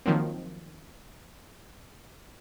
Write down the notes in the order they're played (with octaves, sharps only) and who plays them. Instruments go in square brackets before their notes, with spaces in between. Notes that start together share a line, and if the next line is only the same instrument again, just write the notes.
[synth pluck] D#3 F3 F#3 A#3 C4